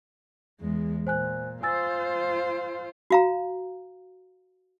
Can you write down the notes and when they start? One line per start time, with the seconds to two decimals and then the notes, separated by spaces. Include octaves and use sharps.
0.61 E2 G#3
1.07 A#2 C5 G#5 F#6
1.63 F4 C5 G#5 E6 A6
3.11 F#4 F5 A#5